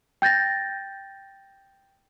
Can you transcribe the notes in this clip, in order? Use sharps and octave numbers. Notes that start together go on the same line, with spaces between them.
G5 G6 A6 A#6